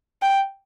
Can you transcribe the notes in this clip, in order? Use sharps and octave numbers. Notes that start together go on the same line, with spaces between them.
G5